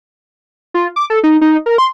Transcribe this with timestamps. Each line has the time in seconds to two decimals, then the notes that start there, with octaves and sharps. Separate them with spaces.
0.74 F4
0.96 D6
1.10 A4
1.24 D#4
1.41 D#4
1.66 A#4
1.78 C6